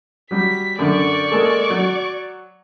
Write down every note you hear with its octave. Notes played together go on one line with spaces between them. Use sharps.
F#3 G3 B6
F#2 D3 D5 C#6
G#3 A#3 A4
F#3